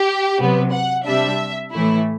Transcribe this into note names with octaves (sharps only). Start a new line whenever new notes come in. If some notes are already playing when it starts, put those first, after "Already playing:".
Already playing: G4
C3 F#3 B3
F#5
C3 G3 D4 E5
A2 E3 A3 E4